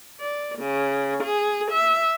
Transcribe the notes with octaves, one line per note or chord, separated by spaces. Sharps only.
D5
C#3
G#4
E5